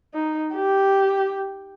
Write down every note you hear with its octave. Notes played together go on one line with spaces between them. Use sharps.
D#4
G4